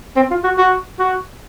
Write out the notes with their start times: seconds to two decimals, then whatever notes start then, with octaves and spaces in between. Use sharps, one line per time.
0.16 C4
0.31 F4
0.44 F#4
0.58 F#4
0.99 F#4